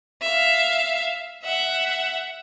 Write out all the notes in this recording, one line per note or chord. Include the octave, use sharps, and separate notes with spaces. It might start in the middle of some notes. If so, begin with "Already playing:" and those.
E5 F5
E5 F#5